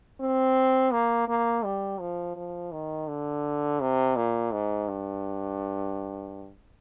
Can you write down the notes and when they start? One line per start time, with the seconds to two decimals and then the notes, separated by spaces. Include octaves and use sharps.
0.20 C4
0.92 A#3
1.28 A#3
1.64 G3
2.00 F3
2.36 F3
2.72 D#3
3.08 D3
3.81 C3
4.16 A#2
4.52 G#2
4.88 G2